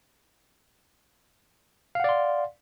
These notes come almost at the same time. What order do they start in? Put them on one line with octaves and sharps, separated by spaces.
F5 F#5 D5 C6